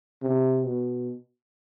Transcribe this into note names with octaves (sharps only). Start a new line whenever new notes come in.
C3
B2